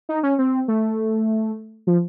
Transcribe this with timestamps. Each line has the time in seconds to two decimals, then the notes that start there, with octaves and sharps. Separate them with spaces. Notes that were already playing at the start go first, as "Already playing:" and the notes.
0.09 D#4
0.23 C#4
0.39 C4
0.68 A3
1.87 F3